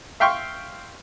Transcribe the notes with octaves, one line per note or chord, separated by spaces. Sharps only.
E5 F5 G5 C6 C#6